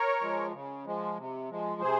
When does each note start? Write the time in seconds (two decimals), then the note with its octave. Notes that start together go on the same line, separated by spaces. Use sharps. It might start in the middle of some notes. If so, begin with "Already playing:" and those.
Already playing: A#4 C#5
0.21 F3 G#3
0.53 C#3
0.85 F3 G#3
1.18 C3
1.50 F3 G#3
1.81 C3 G#4 C5